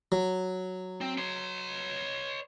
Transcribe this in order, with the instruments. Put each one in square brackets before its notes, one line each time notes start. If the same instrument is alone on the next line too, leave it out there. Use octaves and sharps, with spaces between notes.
[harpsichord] F#3
[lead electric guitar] C4
C#5 C6